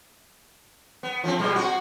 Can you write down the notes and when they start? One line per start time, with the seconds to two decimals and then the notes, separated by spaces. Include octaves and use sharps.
1.03 B3
1.24 F3 G#3 C4
1.39 A#2 G3 G#3
1.56 C4 F#4